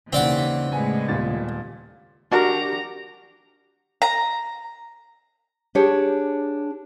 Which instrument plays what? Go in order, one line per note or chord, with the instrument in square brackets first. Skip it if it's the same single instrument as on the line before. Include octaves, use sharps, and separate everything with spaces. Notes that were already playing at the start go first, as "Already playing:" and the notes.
[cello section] D#2 E3 [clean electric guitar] C#3 [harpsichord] C4 D5 F#5
[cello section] A2 G#3 B3 [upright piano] G#5
[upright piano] D#1 A#2 A6
[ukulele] D4 F#4 A#4 [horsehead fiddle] G4 A#5
[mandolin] A#5
[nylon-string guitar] D4 G4 G#4 C#5